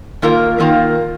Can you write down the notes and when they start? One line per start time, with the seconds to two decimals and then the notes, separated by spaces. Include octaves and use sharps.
0.22 D#3 A#3 F4 A#4
0.59 D#3 A#3 F4 A#4